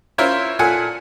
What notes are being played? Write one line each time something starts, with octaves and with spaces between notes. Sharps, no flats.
C#4 E4 F4 A#4 C5 C#5
A#2 A4 F#5 G#5